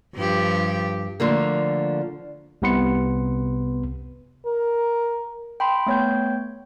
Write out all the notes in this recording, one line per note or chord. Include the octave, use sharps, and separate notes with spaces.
G2 F3 G4
D3 F3 A3 A#3
C2 C3 B3 B4 C6 C#7
A#4
G5 B5 C6
A3 B3 C#5 G5 G6